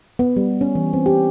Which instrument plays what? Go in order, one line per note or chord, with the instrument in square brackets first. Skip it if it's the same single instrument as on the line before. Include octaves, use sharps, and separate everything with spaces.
[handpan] B3
G3
C#4
E3
C4
G4